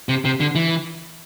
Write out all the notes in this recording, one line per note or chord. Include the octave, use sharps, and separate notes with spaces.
C3
C3
D3
E3